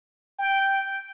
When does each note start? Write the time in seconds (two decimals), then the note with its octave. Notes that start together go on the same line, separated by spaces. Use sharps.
0.39 G5